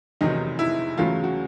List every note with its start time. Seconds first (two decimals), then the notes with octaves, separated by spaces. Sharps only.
0.21 F1 E2 C3 D#3 F#3 D#4
0.59 E4
0.98 E2 C#3 F#3 A3 F4
1.24 F#4